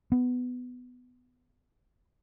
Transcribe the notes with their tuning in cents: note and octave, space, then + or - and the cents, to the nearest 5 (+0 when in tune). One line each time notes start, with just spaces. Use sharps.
B3 +10